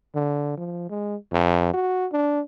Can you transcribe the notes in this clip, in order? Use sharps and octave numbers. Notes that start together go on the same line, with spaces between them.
D3
F3
G#3
F2
F#4
D4